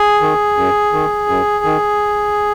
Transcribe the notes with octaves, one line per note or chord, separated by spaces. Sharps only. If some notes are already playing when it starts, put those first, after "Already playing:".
Already playing: G#4
D#3
F#2
D#3
F#2
D#3